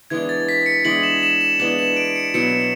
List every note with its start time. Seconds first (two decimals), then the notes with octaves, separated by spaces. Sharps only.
0.10 E3 G#3 B3 D4 G#6
0.29 A6
0.49 B6
0.66 C#7
0.85 E3 G#3 B3 D4 F#7
1.03 E7
1.23 E7
1.41 E7
1.59 E3 G#3 B3 D4 F#7
1.79 E7
1.97 D7
2.16 C#7
2.34 B2 F#3 B3 E4 C#7